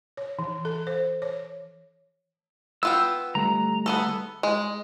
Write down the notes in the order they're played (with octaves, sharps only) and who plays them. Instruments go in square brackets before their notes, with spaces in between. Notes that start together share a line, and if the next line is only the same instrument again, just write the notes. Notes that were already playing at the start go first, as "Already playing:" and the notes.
[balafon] C#5
E3
A4
C5
C#5
[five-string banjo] B3 F4 G5 [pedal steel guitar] E6
[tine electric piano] D3 G3 A3 [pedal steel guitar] A#5
[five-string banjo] B3 G#4 A4
G#3